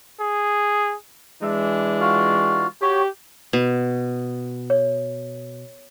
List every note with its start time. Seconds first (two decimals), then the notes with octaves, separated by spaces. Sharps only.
0.20 G#4
1.43 E3 G#3 D4 E5
2.01 F4 F#4 F5
2.82 F#4 G4 C#5
3.53 B2
4.70 C#5